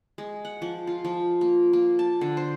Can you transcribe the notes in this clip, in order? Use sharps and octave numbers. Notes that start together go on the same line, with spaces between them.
G#3
F#5
F3
F4
F3
A#3
A#3
A5
D3
C5